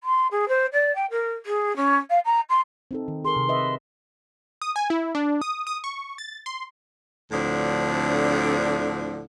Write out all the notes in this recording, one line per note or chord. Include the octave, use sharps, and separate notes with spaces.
C6
G#4
C5
D5
G5
A#4
G#4
C#4
F5
A#5
C6
C4 D#4 A4
D#3
G#4 A#4 C6
C3
B4 D#5 E5
D#6
G#5
E4
D4
D#6
D#6
C#6
A6
C6
D2 A2 D3 F3 C4 D4